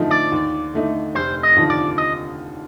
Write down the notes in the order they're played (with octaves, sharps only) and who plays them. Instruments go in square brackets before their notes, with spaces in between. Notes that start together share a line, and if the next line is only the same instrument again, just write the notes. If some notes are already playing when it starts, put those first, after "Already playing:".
Already playing: [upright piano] F2 D3 F3 A3 D#4
[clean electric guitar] D5
[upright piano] D#2
D3 A3 D#4
[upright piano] F1 [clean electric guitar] C5
[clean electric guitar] D#5
[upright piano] D#2 D3 F3
[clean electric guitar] D5
D#5